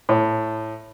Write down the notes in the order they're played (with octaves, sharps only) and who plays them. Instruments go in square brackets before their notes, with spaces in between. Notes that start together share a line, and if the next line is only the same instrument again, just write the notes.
[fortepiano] A2